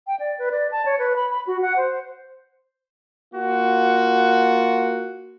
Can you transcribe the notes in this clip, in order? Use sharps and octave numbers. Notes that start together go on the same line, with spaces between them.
G5
D5
B4
D5
A5
C#5
B4
B5
B5
F#4
F#5
C5
A#3 F4 F#4